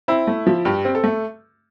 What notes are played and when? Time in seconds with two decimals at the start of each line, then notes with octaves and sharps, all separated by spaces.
0.08 C4 E4
0.27 A3
0.47 F3
0.65 G2 G4
0.85 C4
0.95 A4
1.04 A3